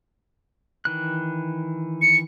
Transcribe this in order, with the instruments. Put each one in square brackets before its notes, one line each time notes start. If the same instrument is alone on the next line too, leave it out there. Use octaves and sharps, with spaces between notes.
[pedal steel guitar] D#3 E3 F#6
[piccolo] C#7